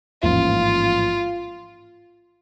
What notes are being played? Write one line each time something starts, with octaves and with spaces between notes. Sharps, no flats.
A1 G#2 F3 A#3 C#4 F4